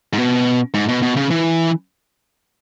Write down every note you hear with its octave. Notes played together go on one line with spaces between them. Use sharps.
G#2
B2
G#2
B2
B2
C#3
E3